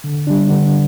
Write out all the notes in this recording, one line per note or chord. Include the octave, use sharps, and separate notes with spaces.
D3
G3 D4
D3